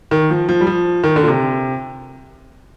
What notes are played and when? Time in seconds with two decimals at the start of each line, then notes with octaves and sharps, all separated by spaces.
0.11 D#3
0.30 F3
0.49 F3
0.61 G3
0.67 F3
1.04 D#3
1.16 D3
1.23 A#2
1.28 C3